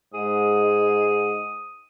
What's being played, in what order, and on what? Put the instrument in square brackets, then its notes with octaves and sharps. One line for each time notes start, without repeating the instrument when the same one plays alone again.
[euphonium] G#2 [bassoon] G#4 [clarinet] D#6